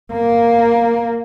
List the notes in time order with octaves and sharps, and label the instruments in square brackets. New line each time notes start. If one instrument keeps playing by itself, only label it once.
[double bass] A#3